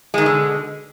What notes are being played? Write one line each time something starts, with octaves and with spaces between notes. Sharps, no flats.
B2 D3 D#3 G#3